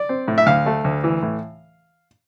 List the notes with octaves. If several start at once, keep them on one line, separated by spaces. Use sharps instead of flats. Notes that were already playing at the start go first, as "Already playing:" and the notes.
Already playing: D5
C4
A2
E5
D2 F5
A3
D2
E3
A2